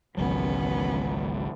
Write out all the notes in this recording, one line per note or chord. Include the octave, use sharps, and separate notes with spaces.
G#1 C#2 E3 F#3 B3 C#4